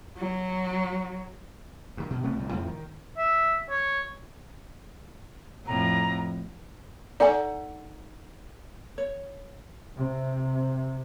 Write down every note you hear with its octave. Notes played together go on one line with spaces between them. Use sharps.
F#3
G2 D#3
B2
C3 A3 B3 C#4
G1 C2 A2
F2 A2 C#3 F3
D#3
E5
C#5
F2 A2 A#5
D#4 A4 D5 F#5 G#5
C#5
C3